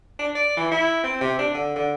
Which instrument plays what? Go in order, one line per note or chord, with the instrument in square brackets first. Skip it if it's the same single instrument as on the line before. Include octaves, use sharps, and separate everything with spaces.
[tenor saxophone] D4
D5
E3
E4
C4
C3
D4
D3
D3